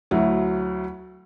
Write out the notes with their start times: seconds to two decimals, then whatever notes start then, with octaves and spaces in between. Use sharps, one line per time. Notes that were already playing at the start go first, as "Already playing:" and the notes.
0.11 D2 F#3 E4